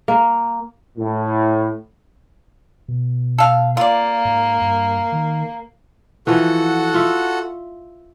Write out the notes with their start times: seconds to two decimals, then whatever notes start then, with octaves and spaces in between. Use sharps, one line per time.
0.08 A#3
0.98 A2
2.88 B2
3.38 A4 F5
3.77 A#3 F4 D5
4.25 G#2
4.62 G2
5.12 D#3
6.27 E3 F3 F#4 A4 F#5
6.94 F4 E5